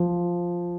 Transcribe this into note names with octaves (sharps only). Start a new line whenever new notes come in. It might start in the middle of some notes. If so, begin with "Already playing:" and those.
Already playing: F3